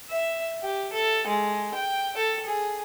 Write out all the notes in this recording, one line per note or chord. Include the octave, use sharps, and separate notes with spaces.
E5
G4
A4
G#3
G5
A4
G#4